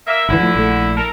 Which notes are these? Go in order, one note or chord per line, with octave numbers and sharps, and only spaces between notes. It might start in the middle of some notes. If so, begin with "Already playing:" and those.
A#3 E5
G#1 C#2 D3 E3 E4
F3 A3
A#1 A3
A4 A#4